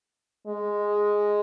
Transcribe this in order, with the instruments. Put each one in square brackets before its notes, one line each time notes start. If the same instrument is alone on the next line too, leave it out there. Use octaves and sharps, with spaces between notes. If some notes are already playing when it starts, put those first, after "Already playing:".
[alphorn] G#3